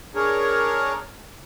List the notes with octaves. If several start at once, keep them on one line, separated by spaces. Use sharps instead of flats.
D4 G#4 A#4 C#5